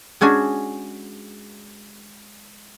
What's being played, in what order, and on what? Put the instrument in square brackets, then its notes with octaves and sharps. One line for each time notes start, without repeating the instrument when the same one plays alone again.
[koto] G#3 C#4 D4 F#4 G#4